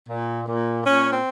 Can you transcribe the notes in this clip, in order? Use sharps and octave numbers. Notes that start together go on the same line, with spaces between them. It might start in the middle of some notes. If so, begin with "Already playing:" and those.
A#2
A#2
A#2 C#4
C4